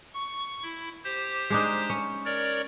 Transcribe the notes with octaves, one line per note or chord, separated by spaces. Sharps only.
C#6
E4
G4 C5
G#3 D4 D#4
C#4
A#4 C#5 D5